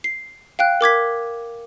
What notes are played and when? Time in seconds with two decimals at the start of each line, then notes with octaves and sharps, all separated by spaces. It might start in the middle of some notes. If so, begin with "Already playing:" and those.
0.04 C7
0.59 F5 G5 F#6
0.81 A#4 D6 G#6 B6